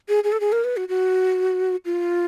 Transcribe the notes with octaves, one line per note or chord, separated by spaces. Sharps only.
G#4
G#4
A4
G#4
A#4
B4
F#4
F#4
F4